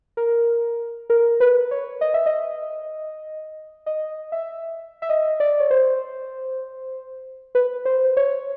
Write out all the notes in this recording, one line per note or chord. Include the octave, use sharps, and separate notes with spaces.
A#4
A#4
B4
C#5
D#5
E5
D#5
D#5
E5
E5
D#5
D5
C#5
C5
B4
C5
C#5